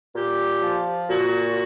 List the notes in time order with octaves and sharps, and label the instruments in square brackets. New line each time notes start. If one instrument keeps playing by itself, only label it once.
[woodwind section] A#2 G4
F3
A#2 F#4